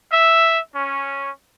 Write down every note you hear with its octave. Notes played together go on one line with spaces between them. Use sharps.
E5
C#4